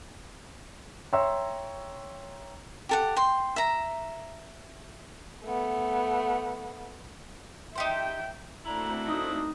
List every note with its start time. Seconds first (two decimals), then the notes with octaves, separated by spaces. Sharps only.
1.13 C#5 E5 G5 A#5 C6 E6
2.89 G4 A4 F#5
3.16 G5 C6
3.56 E5 A#5
5.44 A3 B3
7.75 D#4 G4 C5 E5 G5
8.65 A3 A#3 C4 D4 E4 F#4 A#5
9.08 D#4 D#6